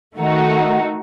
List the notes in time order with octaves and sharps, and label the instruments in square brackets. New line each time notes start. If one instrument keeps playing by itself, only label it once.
[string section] D#3 A3 D#4 F#4